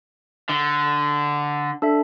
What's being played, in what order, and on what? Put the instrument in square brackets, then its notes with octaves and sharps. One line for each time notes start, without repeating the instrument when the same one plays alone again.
[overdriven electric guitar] D3
[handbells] D4 A4 E5